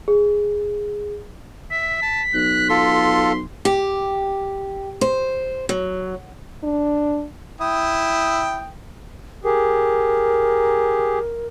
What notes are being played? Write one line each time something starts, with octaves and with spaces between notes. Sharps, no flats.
G#4
E5 B6
A5
B1 F#6
F4 A4 C6
G4
C5
F#3
D4
E4 G5 D#6
G4 G#4 A#4